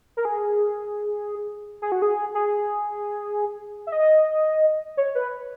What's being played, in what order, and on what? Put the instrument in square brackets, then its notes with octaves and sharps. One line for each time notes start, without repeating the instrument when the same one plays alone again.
[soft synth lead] A#4
G#4
G#4
F#4
G#4
G#4
E5
D#5
C#5
B4